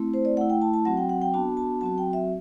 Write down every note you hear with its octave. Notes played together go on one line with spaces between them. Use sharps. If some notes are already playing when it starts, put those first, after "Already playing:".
Already playing: A3 C4 E4
C5
D5
A3 E4 F#5
G5
A5
A5
F#3 C4 F#4 F#5
G5
F#5
G5
B3 D4 F#4 A5
A5
F#3 C4 F#4 A5
G5
E5